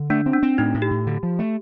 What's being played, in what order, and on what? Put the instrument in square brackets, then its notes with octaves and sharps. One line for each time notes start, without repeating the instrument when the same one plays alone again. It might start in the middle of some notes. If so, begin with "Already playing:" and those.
Already playing: [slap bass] D3
[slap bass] A3 [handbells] D4
[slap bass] C4
[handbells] D4
[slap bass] C4
[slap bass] A2 [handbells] D#4
[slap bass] A2
[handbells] G4
[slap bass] A2
D3
F3
A3